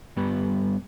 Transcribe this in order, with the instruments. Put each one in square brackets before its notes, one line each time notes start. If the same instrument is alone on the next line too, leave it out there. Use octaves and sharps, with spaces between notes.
[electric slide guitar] G2 G3 B3 G4 B4